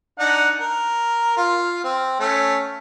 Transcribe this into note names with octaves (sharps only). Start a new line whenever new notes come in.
D4 D#4 F#5
A#4
F4
C4
A3 C#4